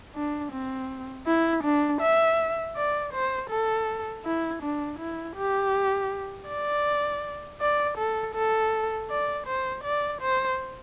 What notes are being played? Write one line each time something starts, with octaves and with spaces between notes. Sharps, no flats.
D4
C4
E4
D4
E5
D5
C5
A4
E4
D4
E4
G4
D5
D5
A4
A4
D5
C5
D5
C5